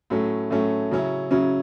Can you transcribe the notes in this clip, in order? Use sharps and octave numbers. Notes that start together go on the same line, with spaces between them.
A2 F#3 A3 C#4
A2 F#3 A3 C#4
C#3 F#3 C#4 E4
C#3 F#3 C#4 E4